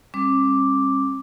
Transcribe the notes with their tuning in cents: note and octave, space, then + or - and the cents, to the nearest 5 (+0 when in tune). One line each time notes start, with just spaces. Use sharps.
G3 +25 C#4 -45 D6 +0